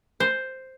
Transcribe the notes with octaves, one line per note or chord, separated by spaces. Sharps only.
C5